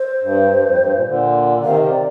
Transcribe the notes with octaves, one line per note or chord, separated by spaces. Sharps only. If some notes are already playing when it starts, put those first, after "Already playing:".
Already playing: C5
G2
G2
F2
G2
A#2
A#2 D3
D3
C3 D#3 F5
D#5
D5